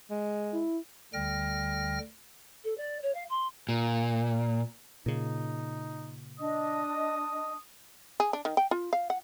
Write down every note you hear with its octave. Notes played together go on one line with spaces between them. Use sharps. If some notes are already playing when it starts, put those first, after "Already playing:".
G#3
E4
D2 D3 G3 G5 F6 A#6
A4
D5
C#5
F5
C6
A#2
A#2 C#3 D#4
D4 D#5 D#6
G#4
D4
D#3
G5
F4
F5
F#5